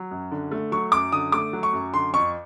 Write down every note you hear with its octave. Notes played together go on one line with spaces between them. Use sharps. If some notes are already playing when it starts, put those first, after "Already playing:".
Already playing: F#3
F#2
D3
A3
F#3 C#6
F#2 D6
D3 D#6
A3 D6
F#3
C#6
F#2
D3 C6
F2 C#6